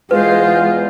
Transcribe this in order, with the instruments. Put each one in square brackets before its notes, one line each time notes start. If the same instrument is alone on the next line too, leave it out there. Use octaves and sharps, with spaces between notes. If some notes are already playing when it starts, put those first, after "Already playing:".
[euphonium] E2 [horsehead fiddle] G#3 C5 [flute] F4 [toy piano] B4